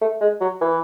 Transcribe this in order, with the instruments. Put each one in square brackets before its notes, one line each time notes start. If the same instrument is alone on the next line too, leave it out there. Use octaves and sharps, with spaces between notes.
[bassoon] A3
G#3
F#3
E3